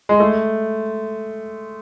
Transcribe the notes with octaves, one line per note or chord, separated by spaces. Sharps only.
G#3
A3